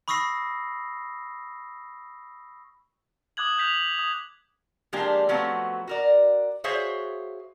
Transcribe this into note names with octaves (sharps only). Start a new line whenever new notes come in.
B5 C#6 D#6 E6 A#6 C7
D6 D#6 F#6 G#6 F#7
F#6 G6 B6 F7
F#7
D#6
F3 G#3 A#3 D4 G4
F3 F#3 A3 B3 C4
F#4 A#4 D5
F#4 G#4 C5 C#5 E5 F5